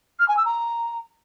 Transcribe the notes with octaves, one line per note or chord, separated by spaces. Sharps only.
F6
G#5
E6
A#5